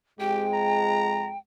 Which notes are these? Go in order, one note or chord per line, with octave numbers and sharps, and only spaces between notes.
F2 G#3 G4 G5
A#5